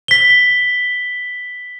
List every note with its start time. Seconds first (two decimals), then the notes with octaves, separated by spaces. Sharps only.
0.08 B6 G7